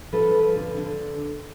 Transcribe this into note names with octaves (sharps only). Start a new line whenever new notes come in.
F3 A4 B4
F3
D3
D3